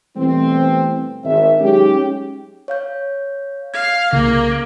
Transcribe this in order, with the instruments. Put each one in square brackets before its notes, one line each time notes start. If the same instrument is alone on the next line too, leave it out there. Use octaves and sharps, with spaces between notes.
[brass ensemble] B2 E3 G3 A3 C4
G#1 E5
F#3 G#3 C#4 D#4 G4
[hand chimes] C#5 F5 G6
[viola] F5 [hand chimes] G#6
[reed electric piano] C2 C#3 [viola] A#3